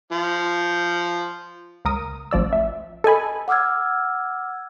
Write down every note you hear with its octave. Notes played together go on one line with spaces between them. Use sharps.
F3
C#2 A#4 D#6
A1 F3 D5 E6
E5
A4 D#5 G#5 B5
F#5 D6 E6 F6 G#6